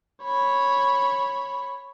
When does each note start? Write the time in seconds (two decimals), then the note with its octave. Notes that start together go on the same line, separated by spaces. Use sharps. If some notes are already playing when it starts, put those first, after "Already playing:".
0.24 C#5 B5